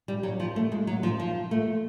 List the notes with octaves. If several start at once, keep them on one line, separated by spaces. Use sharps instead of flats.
G3
F#3
F3
A3
G#3
F#3
F3
F3
A3